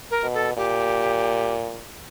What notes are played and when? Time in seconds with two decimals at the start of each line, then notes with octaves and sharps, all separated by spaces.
0.11 A#4
0.23 B2
0.34 A4
0.57 A#2 G4